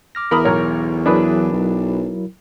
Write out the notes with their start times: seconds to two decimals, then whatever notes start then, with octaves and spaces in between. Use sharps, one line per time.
0.15 D6 F6 A#6
0.31 E2 A#4 B5 D#6
0.45 B1 A#4 C#5
1.06 F#3 D4 E4 G#4 A#4 B4
1.52 B1